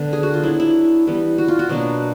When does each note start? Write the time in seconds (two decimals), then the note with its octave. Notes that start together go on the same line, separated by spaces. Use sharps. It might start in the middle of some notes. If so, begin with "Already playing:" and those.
Already playing: D3 B3
0.13 G#4
0.23 F#4
0.34 F4
0.43 F#3 B3 D4 E4
0.60 E4
1.07 E3 G3 B3
1.38 F#4
1.48 F4
1.59 F#4
1.69 B2 F#3 A#3 D4